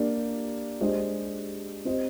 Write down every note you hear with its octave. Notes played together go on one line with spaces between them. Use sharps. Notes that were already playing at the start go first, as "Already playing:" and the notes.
Already playing: A#3 D4 G4 D5
G#3 D4 G4 C5 D#5
C4 G4 C5 D#5